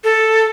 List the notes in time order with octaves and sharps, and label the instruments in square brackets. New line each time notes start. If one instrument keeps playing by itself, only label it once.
[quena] A4